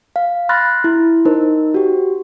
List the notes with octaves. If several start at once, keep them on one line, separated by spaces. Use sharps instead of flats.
F5
B5 C6 F6 F#6 A6 A#6
E4
D#4 A#4 C5
F#4 G4